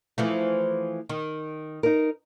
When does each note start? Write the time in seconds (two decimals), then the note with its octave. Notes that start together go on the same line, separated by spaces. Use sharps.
0.18 E3 F3 A3
1.09 D#3
1.83 D#4 A#4